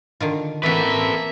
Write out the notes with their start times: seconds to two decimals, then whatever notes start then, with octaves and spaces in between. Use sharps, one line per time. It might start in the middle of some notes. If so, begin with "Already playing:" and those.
0.20 D3 D#3 F4
0.63 E3 A#3 C4 F#4 A4 B4 E5